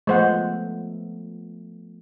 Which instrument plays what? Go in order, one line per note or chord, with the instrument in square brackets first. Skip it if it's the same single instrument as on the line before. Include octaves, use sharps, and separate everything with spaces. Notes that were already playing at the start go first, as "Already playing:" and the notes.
[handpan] F3 A3 B3 [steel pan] G#3 C5 F#5